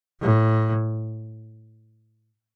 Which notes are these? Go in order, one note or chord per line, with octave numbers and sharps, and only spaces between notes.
A2